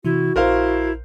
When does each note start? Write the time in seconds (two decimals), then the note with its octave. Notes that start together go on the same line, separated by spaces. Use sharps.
0.05 C3 E3 E4 F#4
0.36 A#1 E4 A#4 C5 F5